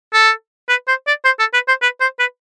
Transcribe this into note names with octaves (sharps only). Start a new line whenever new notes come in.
A4
B4
C5
D5
C5
A4
B4
C5
B4
C5
B4